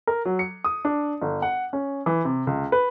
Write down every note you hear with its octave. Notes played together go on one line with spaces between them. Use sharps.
A#4
F#3
C#7
D#6
D4
G1
F#5
C#4
E3
C3
C#2
B4